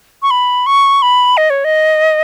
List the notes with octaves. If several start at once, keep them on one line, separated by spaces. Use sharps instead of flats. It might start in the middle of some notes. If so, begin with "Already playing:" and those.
C#6
B5
C#6
B5
D#5
C#5
D#5